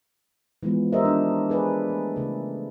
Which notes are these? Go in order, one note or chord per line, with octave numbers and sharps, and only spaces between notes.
E3 F3 G#3 B3
F3 G4 A#4 C5 D#5 E5
D4
G#4 B4 D5
A3
C#3 A3